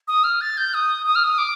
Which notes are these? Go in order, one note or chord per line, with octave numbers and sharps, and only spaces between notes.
D#6
F6
A6
G6
D#6
D#6
F6
D#6
D6